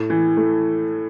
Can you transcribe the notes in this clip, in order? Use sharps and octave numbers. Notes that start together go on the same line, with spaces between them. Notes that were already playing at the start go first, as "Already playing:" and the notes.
Already playing: A2
E3
A3